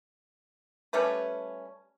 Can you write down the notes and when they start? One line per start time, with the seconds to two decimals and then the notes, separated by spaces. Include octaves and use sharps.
0.93 G3 A3 C#4 B4